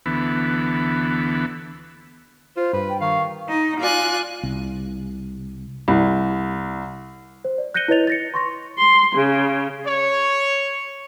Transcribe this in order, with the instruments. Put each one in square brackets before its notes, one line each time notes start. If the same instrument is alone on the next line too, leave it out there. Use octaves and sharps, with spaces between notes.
[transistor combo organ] D2 E3 B3
[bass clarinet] F4 [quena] C5
[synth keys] G2 [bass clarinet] B4
[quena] G5
[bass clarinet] D#3 [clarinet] F5 [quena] C#6
[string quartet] D#4
F4 D5 G#5 F#6
[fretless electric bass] C2
[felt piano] C2
[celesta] C5
D5
F#6 G6 A#6 C#7 D#7 G7
E4 B4 C#5 D#5 A6 F7
A6 A#6 C#7
C6 C#6 A#6
[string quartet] C6
C#3
[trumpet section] C#5